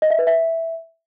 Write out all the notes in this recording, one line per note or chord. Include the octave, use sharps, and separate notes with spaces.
D#5
E5
B4
E5